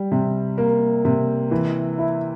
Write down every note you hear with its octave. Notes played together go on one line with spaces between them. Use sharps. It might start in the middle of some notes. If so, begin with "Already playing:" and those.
Already playing: G3
C3
A#3
C3
E3
E4